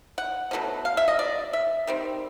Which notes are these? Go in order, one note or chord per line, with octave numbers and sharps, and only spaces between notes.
F#5
B2 F#3 A3 C#4
F5
E5
D#5
D5
E5
D#3 G3 C4